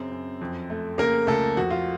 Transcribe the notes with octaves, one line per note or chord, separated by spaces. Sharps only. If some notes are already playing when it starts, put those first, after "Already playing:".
Already playing: F#2 C#3 C4
F#2
F2
A3
C#3 A#3 A#4
C#2 A3 A4
F2 F#4
F4